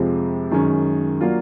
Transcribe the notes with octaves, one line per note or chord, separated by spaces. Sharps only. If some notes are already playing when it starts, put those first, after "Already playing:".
Already playing: F2 C3 F3 G#3 C4
F#2 D#3 G#3 C#4
F#3 A#3 D4 F4